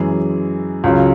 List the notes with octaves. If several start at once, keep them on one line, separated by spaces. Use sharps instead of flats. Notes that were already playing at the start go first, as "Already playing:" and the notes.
Already playing: F#2 E3 G#3 G#4
C#2 C#3 F#3